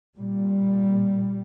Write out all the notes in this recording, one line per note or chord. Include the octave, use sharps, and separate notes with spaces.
A#2 G3